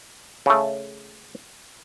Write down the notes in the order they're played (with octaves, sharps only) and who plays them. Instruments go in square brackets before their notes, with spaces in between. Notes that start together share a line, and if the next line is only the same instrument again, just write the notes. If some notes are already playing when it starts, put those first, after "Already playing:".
[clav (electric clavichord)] C#3 A3